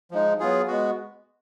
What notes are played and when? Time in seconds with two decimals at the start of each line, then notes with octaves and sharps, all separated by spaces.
0.11 F3 G#3 D#4
0.39 F#3 B3 F4 G#4
0.67 G#3 B3 F#4